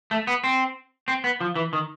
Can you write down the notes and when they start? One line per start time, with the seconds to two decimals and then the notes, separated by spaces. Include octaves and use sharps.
0.11 A3
0.27 B3
0.44 C4
1.08 C4
1.24 B3
1.41 F3
1.56 E3
1.73 D#3